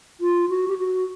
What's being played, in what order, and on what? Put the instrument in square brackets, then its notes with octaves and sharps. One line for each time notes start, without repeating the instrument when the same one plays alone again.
[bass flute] F4
F#4
G4
F#4